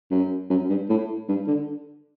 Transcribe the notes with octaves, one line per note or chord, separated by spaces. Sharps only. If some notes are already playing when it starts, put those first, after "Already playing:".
F#2
F#2
G2
A2
G2
D3